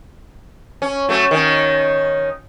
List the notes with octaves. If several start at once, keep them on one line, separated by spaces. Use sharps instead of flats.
C#4
F#3 A3 C#4
D#3 C#4